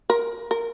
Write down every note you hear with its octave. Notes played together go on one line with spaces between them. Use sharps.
A#4
A#4